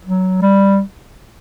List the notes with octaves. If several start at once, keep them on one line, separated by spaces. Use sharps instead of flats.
F#3
G3